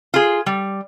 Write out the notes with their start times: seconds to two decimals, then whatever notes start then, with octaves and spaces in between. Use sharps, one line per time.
0.14 F4 G#4
0.46 G3